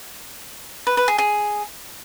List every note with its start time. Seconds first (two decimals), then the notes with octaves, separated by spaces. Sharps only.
0.87 B4
0.97 B4
1.08 G#4
1.18 G#4